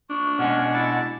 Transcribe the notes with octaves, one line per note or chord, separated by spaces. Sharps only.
D4 C#6
B2 G#3 C#4 F#5
E4 A5